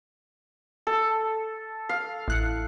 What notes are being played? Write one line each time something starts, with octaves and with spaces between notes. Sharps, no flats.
A4
F5
A1 F#6 C#7